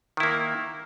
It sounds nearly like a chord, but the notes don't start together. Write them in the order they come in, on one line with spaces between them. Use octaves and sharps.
D#3 E4 A#3